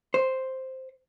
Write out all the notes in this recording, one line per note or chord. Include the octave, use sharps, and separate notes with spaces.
C5